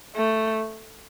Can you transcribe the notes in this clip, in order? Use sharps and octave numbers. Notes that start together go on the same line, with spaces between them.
A3